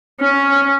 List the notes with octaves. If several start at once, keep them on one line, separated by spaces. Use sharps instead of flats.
C#4